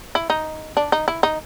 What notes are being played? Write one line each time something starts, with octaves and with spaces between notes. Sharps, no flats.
E4
D#4
D4
D#4
E4
D#4